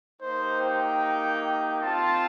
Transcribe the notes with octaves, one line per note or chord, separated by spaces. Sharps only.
A#3 D#4 G4 C5
G5
C4 F4 A5